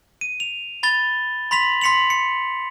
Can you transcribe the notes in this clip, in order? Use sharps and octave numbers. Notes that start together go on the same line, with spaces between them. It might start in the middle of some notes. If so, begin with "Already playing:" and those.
D#7
F7
B5 A6 G7
B5 C6 B6 F7 F#7
C6 B6 C#7 F7 F#7
C#7